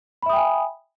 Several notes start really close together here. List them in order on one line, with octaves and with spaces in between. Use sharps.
B5 E5 D#6 G5 G#5